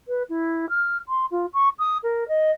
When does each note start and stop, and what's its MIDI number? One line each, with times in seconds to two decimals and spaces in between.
0.07 0.22 71
0.29 0.65 64
0.69 0.96 89
1.08 1.25 84
1.31 1.46 65
1.53 1.68 85
1.78 1.97 87
2.03 2.27 70
2.28 2.51 75